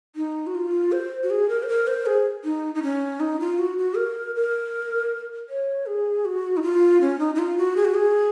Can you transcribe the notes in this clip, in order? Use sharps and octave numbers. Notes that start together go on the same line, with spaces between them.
D#4
F#4
F4
C5
F#4
G#4
A#4
C5
A#4
C5
G#4
D#4
D#4
C#4
D#4
F4
F#4
F#4
A#4
A#4
C#5
G#4
F#4
D#4
F4
C#4
D#4
D#4
F4
F#4
G#4
F#4
G#4